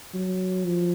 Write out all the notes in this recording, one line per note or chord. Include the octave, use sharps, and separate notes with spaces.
F#3
F3